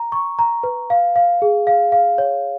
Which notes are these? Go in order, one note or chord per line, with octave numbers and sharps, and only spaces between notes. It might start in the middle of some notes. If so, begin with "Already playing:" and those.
Already playing: A#5
C#6
A#5
B4
F5
F5
G#4
F5
F5
C#5